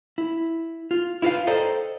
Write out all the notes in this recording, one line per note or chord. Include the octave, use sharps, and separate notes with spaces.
E4
F4
E4 F4 A4 B4 F5
A4 C5 D5 D#5 G5 A#5